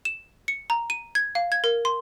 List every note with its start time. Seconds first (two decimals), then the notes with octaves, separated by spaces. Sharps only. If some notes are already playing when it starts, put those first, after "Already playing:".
0.05 E7
0.48 C#7
0.70 A#5
0.90 D#7
1.15 G#6
1.35 F5
1.52 G#6
1.64 A#4
1.85 C6